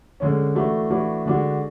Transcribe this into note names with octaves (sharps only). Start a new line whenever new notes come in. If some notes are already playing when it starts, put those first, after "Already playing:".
D3 G#3 C#4
E3 A3 D4 F#4
E3 A3 D4 F#4
D3 G#3 D4 F#4